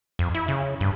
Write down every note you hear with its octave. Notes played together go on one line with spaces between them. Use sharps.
F2
E4
C#3
G2